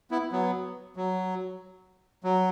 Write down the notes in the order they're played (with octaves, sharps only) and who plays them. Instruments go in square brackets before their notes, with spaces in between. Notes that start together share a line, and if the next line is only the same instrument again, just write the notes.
[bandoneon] B3 E4
F#3 B3
F#3
F#3